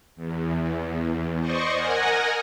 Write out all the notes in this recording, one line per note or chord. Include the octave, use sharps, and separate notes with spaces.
E2
C5 D5 D#5 C#6
A#4 D#5 F#5 G#5 A#5